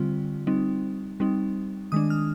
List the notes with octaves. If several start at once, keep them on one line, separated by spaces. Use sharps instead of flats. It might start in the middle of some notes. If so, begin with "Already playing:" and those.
Already playing: D3 G3 C4 F4
G3 C4 D#4
G3 C4 D#4
D#3 G#3 D4 D#6
F6